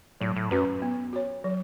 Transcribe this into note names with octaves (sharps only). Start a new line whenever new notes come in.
A2 F#3
A2
F#2 C#4 F#4 B4
B3
F#4 C#5
F#3